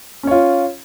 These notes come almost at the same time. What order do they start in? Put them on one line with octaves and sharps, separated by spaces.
C#4 C#5 F4